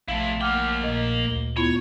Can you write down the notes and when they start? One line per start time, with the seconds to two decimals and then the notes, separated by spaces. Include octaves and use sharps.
0.08 A#1 C3 A3 E4 F5
0.41 A#3 F#5 G5 D6 F6
0.83 A#2 D#5
1.30 D2 G7
1.57 B3 E4 F4 C#5